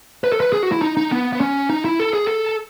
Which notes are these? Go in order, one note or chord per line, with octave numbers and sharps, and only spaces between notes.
B4
A4
B4
G#4
F#4
E4
D#4
D#4
B3
B3
C#4
D#4
E4
A4
G#4
A4